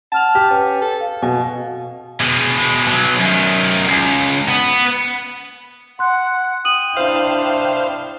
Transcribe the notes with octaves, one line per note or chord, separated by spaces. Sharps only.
F#5 A5 F6 F7
G4 F6
C#4 B4
A4
F5
B2 G#5
B2 G#3
B2 F#3
F#2 D#3
C#2
B3
F#5 C6 F#6
G5 D#6 D#7 F#7
D4 E4 C5 F5